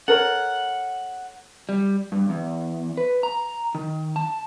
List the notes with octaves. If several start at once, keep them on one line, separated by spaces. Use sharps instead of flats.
A4 A#4 C#5 F#5
G3
G2
E2
B4
A#5
D#3
A5